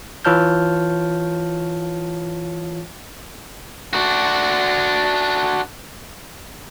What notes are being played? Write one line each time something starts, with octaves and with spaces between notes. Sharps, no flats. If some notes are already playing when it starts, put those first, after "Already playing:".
E3 F4 C#5 A5 F6 G6
D4 F#4